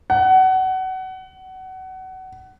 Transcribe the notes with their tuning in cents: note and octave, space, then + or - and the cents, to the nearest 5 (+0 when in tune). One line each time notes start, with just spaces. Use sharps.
F#5 +25